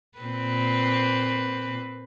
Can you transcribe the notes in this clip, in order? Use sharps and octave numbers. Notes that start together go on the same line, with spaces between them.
A#2 C4 B4